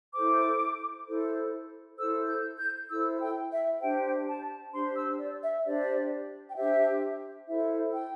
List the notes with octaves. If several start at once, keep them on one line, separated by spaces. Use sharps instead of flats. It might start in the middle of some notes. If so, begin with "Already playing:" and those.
E4 A4 C5 D6
E4 A4 C5
E4 A4 C5 E6
G6
G6
E4 A4 C5 E6
G5
E5
D4 G4 C5 G5
A5
D4 G4 C5 C6
E6
D5
E5
D4 G4 C5 D5
G5
D4 G4 C5 E5
E4 A4 C5 E5
G5